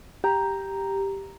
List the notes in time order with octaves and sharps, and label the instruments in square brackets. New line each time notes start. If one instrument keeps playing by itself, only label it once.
[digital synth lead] G4 [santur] A#5